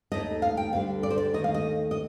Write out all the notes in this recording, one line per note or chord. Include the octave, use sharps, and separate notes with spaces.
D#2 D#3 A3 D#5
F5
G5
D2 D3 G3 F5
D5
C5
D5
D#2 D#3 A3 D#5
F5
D#5
D#5